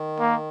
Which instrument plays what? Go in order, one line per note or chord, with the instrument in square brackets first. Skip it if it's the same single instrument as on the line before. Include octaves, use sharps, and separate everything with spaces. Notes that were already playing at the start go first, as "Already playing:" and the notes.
Already playing: [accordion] D#3
[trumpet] A#3